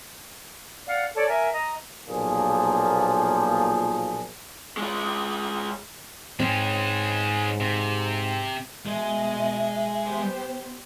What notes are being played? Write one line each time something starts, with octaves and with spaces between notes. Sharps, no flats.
D5 F5 F#5
A4 C#5 D5 A5
A#4 E5 G#5
D#5 A#5
B1 A#2 F3 A#3 G#4
G#3 F4
G#2 G#3 C4 C#4
C3
B2 G#3 D#5 E5
B3 G4 C5